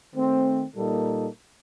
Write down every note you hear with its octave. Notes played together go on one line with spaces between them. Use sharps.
D#3 A3 C4
A#2 G3 A#3 D#4 A4